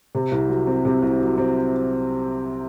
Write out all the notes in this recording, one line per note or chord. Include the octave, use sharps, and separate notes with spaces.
C3
C2
F#3
C4
C3
C2
F#3
C4